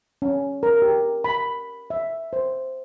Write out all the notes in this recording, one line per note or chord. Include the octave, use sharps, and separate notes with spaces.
C#4
A#4
G4
B5
E5
C5